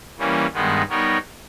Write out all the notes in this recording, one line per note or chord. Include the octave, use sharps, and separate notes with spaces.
E3 G3 A#3 C#4
G2 D#3 G#3 B3 D#4
G3 B3 D#4 A#4 C#5